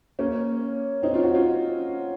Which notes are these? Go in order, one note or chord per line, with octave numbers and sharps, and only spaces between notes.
A#3 C#4
C4 D#4
C#4 F4
D#4 F#4
C#4 F4